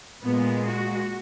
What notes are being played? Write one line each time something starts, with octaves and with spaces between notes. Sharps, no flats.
A#2 G#3 B3
F#4